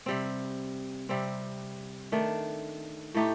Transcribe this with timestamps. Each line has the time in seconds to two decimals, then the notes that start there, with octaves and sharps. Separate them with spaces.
0.06 C3 G3 C4
1.09 C3 G3 C4
2.12 D#3 A3 D4
3.15 A2 A3 D#4 G4